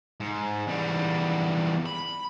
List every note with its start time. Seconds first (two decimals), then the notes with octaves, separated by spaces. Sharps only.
0.20 G#2
0.68 E2 G3
1.86 B5